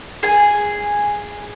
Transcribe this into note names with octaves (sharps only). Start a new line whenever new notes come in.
G#4 G#5